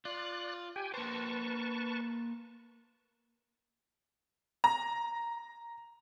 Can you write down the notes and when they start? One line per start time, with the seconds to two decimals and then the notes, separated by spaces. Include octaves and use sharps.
0.05 F4 D5 F#6
0.76 G4 G5 G#5
0.94 A#3 B4 C5 A5 C#6
4.64 A#5